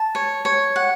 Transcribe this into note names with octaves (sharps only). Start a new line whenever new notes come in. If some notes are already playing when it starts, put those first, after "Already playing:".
Already playing: A5
C#5
C#5
F#5